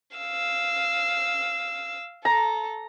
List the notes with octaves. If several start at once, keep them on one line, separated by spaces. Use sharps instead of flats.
F5 E6
A4 A#5